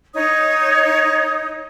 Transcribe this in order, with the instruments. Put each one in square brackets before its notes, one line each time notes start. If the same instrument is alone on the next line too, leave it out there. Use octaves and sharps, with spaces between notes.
[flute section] D#4 C#5 D#6